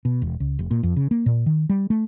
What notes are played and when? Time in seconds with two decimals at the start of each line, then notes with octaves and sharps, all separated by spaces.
0.05 B2
0.22 E1
0.40 C#2
0.59 F1
0.71 A#2
0.83 F2
0.96 C#3
1.11 A#3
1.26 A#2
1.46 D#3
1.69 G3
1.90 A3